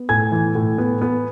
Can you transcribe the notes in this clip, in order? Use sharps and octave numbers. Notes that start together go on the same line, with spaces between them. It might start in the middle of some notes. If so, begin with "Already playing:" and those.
Already playing: B3
A2 G#5 G#6
E3
A2
B3
B3